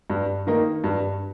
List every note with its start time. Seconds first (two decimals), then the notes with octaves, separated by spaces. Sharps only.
0.10 G2
0.47 D#3 A#3 D#4
0.84 G2